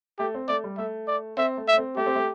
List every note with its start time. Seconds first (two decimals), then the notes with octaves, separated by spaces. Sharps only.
0.19 A3 G4
0.34 C4
0.48 A3 D5
0.64 G3
0.78 A3 E5
1.08 D5
1.37 C4 E5
1.57 A3
1.68 E5
1.73 A3
1.77 C4
1.97 A3 G4
2.06 C4
2.15 A3